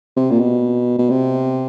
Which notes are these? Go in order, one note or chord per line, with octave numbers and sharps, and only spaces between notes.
C3
A#2
B2
B2
C3